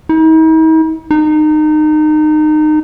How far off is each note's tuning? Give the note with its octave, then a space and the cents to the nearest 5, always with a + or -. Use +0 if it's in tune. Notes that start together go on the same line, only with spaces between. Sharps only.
D#4 +45
D#4 -25